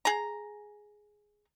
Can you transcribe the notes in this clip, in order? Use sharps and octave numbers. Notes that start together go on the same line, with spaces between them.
G#4 A#5